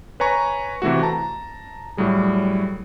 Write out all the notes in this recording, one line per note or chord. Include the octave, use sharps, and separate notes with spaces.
B4 C#5 G#5 A#5 C#6
C3 E3 A3 F#4
A5 A#5
A2 F#3 G3 G#4